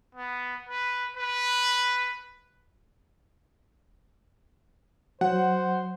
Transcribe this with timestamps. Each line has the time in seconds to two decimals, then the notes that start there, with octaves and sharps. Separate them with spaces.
0.15 B3
0.69 B4
1.17 B4
5.21 F#3 C5 F#5